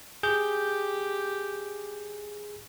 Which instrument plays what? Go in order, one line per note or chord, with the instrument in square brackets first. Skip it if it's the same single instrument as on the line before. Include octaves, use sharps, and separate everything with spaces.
[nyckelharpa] G4 [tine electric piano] G#4 G6